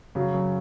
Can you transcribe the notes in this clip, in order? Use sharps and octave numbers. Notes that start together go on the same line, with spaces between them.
C#3 F#3
F#2